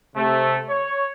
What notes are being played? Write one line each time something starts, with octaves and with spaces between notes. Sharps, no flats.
C3 A3
C#5